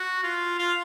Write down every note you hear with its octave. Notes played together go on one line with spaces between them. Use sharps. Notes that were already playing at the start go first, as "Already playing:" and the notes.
Already playing: F#4
F4
F4